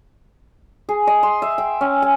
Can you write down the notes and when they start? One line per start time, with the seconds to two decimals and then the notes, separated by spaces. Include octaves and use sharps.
0.89 G#4
1.07 D#5
1.23 C6
1.42 E5
1.58 G5
1.81 C#4
2.02 G#5